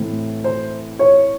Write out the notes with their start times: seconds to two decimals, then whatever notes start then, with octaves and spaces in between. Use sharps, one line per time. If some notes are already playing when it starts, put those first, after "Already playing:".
Already playing: A2 E3 A3 C4
0.44 C5
0.99 C#5